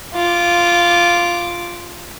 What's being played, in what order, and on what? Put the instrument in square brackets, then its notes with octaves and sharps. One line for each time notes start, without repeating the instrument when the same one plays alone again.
[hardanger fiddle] F4 D6